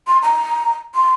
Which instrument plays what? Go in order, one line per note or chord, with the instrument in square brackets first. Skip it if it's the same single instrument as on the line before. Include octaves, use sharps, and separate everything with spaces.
[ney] C6
A#5
C6